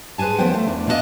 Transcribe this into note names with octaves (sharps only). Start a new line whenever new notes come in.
G#4 B4 C5 G#5 A5
D#2 F3 B3 C#4 C5 G5
A3 C5
E2 D4
E3 B3 D4 F4 D#5 F5